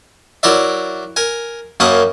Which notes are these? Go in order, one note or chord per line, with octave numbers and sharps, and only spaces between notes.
F#3 E4 A#4 D5 E5
A#4 G#5
F#2 A#3 C#4 A5 B5 D#6